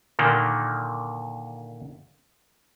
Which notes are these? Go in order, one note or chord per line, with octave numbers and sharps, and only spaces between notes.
A#2 D3 D#3 A#3